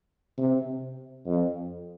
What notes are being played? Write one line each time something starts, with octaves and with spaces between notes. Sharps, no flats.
C3
F2